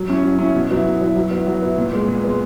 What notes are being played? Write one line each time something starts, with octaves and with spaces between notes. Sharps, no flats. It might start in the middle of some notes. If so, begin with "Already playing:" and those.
Already playing: F#3
C#4 E4
F#3
C#4 E4
B2
F#3 B3 E4
B2
F#3 B3 E4
F#3
B3 E4
F#3
B3 E4
A#2
G#3 B3
A#2
G#3 B3